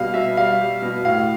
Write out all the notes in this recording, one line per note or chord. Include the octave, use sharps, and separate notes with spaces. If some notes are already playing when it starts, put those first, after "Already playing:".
Already playing: B2 G3 F5
B2 E5
G3 F5
G3
B2
A2 F5